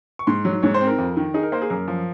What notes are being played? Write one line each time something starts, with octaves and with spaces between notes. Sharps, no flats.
C#6
G#2 C6
F#3
G#2 C#5
C5
C4
A#4
F2
D#3
D#4 G#4
A#4
A#3 C5
G#4
F#2 A#4
F3